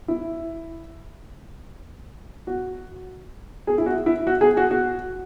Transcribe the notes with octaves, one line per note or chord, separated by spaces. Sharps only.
E4
F#4
G#4
E4
F#4
E4
F#4
G#4
F#4
F#4